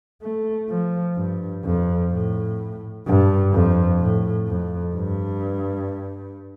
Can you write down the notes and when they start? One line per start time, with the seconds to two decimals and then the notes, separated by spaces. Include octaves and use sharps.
0.22 A3
0.69 F3
1.16 G2
1.64 F2
2.11 A2
3.06 G2
3.53 F2
4.00 A2
4.48 F2
4.95 G2